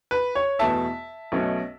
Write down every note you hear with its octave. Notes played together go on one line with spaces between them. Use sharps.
B4
C#5
E2 B2 A3 E5 A5
B1 B2 A3 C#4